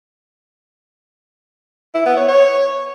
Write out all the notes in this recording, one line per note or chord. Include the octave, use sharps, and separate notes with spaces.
E4
B3
C#5
C#5